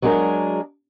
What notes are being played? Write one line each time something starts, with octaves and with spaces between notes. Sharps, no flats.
F#3 G#3 D4 G#4 A#4